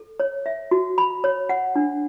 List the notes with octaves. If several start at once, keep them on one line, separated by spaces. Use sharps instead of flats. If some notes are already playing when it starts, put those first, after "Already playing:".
Already playing: A4
C#5
E5
F#4
B5
C#5
F#5
D4